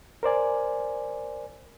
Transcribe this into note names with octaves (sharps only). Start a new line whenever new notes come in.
A#4 C5 D5 G#5